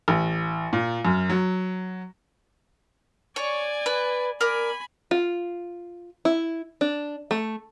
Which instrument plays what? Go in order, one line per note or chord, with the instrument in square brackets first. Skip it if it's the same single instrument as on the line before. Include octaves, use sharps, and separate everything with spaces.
[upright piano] A1
A#2
F#2
F#3
[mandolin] C#5 [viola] D5 G#5
[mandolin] B4
[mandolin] A#4 D5 [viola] G#5 B5
[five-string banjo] F4
E4
D4
A3